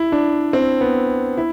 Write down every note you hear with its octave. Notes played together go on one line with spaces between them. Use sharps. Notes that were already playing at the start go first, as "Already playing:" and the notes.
Already playing: E4
D4
C4
B3
E4